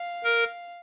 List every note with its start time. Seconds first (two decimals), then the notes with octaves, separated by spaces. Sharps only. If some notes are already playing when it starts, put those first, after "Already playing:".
Already playing: F5
0.24 A#4